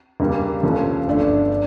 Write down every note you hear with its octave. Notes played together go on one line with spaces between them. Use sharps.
C#2 C#3 G3 A#3
C#2 C#3 F3 A3 C#4
G1 G2 D3 A3 D4
D4